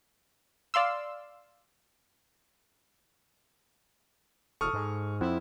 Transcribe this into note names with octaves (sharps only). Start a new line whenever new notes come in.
D5 F5 C6 E6
E1 A4 C#6 D#6 F6
G#2
F2 C4 E4 F#5